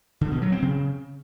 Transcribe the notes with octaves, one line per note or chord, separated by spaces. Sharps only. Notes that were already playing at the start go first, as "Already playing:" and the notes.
D3
B2
F#3
C4
C#3